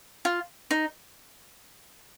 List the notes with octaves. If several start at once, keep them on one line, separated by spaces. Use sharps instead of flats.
F4
D#4